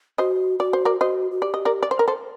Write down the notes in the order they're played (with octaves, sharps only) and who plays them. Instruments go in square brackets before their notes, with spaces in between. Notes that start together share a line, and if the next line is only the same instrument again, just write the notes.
[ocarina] F#4 [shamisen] C5 D#5
[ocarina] F#4 [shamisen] D5
[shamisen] C5
A#4 D5
[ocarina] F#4 [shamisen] C5 D#5
[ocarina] F#4
[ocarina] G4 [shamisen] D5
[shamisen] D#5
A#4 D5
D5
C5
A#4
A4 C5